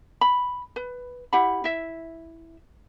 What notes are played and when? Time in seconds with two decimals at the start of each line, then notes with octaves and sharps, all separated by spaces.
0.21 B5
0.76 B4
1.33 E4 G4 F#5 B5
1.64 E4 E5